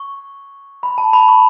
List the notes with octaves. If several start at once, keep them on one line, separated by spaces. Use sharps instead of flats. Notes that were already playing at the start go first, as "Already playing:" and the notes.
Already playing: C#6
B5
A5
B5
C#6